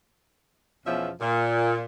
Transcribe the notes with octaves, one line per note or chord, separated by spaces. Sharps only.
E2 B2 F3 C#4 E5
A#2